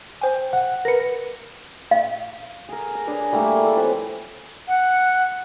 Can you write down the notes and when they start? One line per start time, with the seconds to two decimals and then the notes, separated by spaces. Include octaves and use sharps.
0.21 C5 G5 G#5
0.53 F#5
0.85 A#4 B4 A#6 C#7
1.91 F5
2.69 G#4 A#4
2.95 A#5
3.07 D4 G#4 B4
3.32 G3 A3 A#3 E4
3.61 A4 G#5
3.77 F3 C4 B4 C#5
4.68 F#5